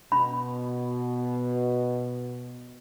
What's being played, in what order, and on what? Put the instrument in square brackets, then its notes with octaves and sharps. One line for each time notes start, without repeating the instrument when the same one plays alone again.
[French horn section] B2 [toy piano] B5